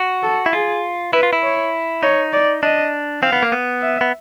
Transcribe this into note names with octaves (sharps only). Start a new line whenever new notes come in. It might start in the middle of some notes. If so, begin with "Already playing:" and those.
Already playing: F#4
A4
E4
F4 G#4
E4 B4
F4
E4
C#5
D#4 C#5
D5
D4 D#5
C4 F5
B3
A#3
B3
E5
B3